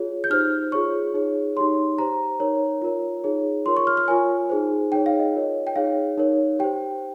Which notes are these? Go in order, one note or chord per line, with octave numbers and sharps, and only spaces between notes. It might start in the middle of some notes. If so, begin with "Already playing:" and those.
Already playing: F4 G#4 C#5
G6
D#4 G4 C5 F6
F4 G#4 C#5 C#6
D#4 G#4 C#5
D#4 G4 C#5 C6
G4 C5 A#5
D#4 A#4 C#5
F4 A#4 C#5
D#4 G#4 C#5
F4 A#4 C#5 C6
C#6
F6
F6
F4 A#4 C#5 G#5
D#4 G#4 C5
D#4 G#4 C#5 G5
F5
D#5
F4 A#4 C#5
G5
D#4 G#4 C#5 F5
D#4 A#4 C#5
G4 C5 G5